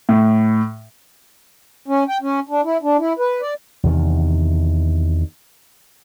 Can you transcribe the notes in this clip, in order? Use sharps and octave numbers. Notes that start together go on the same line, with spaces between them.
A2
C#4
G5
C#4
D4
E4
D4
E4
B4
D5
E2 C3 D#3